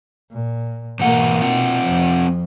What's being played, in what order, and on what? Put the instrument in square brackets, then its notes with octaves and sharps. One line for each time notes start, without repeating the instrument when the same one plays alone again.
[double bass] A#2
[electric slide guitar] G#2 E3 F#5 [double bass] B2 A#3
[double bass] B2 [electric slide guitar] C4 F4 F#5
[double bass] F2 F3